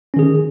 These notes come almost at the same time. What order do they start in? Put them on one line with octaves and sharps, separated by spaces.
C#4 D#3 G#4